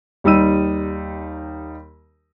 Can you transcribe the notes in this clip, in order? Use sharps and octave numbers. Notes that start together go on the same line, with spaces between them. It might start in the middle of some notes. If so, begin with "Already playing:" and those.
D#2 G3 D#4 E6 D#7